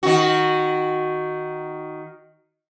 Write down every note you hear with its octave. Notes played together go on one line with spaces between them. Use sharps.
D#3 F#4